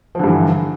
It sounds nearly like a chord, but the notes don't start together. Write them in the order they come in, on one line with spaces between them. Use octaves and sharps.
F3 D3 G2 E3